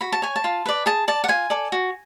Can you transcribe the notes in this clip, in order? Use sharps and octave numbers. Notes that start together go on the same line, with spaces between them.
F#4 B5
A5
C#5 G#5
A5
F4
B4 D5
G#4 A5
D5 A5
F#5
F4 G#5
A4 D5
F#4